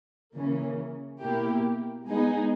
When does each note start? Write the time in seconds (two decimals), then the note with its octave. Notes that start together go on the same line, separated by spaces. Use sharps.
0.34 C#3 E3 A#3 C#4
1.21 B2 A#3 E4 G4
2.07 G#3 B3 D#4 G#4